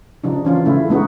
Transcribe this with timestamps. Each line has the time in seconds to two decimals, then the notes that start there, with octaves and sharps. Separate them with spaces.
0.24 C#3 F3 D4 D#4
0.45 E3 C#4 F4
0.66 C#3 A3 E4
0.89 G#3 A3 B3 D#4 F#4